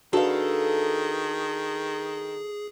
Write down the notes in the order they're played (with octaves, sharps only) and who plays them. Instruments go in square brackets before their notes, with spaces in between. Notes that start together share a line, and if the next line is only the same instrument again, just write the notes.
[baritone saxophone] D#3 [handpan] D4 F#4 B4 [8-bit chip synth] G#4 [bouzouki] A4 F5